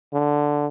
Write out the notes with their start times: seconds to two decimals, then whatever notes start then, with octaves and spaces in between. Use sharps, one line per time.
0.13 D3